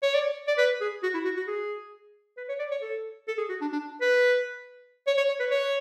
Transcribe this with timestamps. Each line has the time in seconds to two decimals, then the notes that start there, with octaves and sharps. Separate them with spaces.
0.02 C#5
0.14 D5
0.47 D5
0.58 B4
0.80 G#4
1.03 F#4
1.14 E4
1.25 F#4
1.37 F#4
1.47 G#4
2.37 B4
2.49 C#5
2.59 D5
2.71 C#5
2.82 A4
3.28 A4
3.38 G#4
3.49 F#4
3.61 D4
3.72 D4
4.01 B4
5.07 C#5
5.17 C#5
5.29 C#5
5.40 B4
5.51 C#5